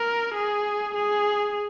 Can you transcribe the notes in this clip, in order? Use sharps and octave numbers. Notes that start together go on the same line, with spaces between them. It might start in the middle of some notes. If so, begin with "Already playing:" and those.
Already playing: A#4
G#4
G#4